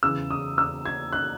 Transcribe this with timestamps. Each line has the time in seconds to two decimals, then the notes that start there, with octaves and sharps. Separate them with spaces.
0.03 E2 C#3 E3 E6
0.31 D#6
0.58 E6
0.85 G#6
1.13 F#6